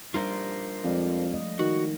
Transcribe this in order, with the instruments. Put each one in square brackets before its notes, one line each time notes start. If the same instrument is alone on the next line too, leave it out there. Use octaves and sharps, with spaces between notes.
[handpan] G3 D4 D#4 [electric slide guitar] F4 A#4 C5
[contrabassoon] F2 [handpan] G#3 D5 F5
[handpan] F3 A3 D#5
[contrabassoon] D#3 [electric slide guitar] F#4